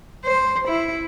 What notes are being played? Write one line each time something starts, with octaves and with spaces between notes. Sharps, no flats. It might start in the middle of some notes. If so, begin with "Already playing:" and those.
C5
E4